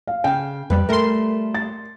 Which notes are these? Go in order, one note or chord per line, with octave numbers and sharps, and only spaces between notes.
F5
C#3 F5 G5
F2 G3 B4
G3 A3 A#4 C6
A6